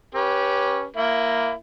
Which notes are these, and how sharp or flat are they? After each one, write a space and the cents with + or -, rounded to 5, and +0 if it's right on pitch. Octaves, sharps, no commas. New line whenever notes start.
C#4 +0 G4 +0 B4 -25
A#3 +0 E4 +15